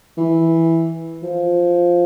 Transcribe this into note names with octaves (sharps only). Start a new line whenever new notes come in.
E3
F3